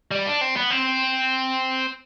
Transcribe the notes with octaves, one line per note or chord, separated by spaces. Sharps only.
G3
D4
C4
B3
C4